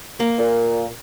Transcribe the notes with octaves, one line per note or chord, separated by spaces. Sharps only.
A#3
A#2